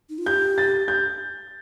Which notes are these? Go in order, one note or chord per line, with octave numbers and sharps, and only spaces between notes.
D#4
F4
G4 G6
A6
G6